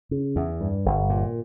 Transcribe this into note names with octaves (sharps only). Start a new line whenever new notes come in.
C#3
E2
G2
G1
A#2